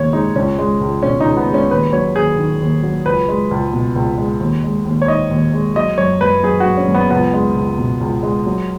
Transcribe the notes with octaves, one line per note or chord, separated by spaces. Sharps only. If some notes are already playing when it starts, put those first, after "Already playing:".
Already playing: D#2 C#3 C#5
G#3 D#4
C#2 C#4
G#3
C#2
B2 C#4
C#2 D#4
B3
G#3
C#4
D#2 B4
F#3 C#5
D#2 G#4
D#3
D#2
F#3
C#2 B4
G#3
C#2
B2
C#2
G#3
D#2
G#3
D#2
C#5
D#3 D#5
D#2
G#3
F#3 D#5
F#2 C#5
F#2 B4
F#3 G#4
F#3 F#4
C#4
F#2
B3
C#2 B3
G#3
C#2
B2
C#2
G#3
F#3